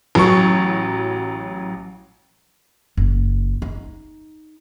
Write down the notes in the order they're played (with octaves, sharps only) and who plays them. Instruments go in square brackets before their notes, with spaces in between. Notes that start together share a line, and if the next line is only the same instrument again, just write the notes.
[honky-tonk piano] A1 F#3 C#6
[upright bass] F#1
D#4